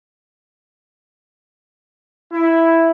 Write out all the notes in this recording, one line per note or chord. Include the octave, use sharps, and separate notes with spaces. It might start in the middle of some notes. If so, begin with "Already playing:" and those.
E4